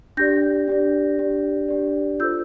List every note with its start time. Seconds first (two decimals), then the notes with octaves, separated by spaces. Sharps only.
0.17 D4 G4 D5 G6 A#6
0.68 D4 G4 D5
1.19 D4 G4 D5
1.69 D4 G4 D5
2.20 F4 A4 C5 E6 G6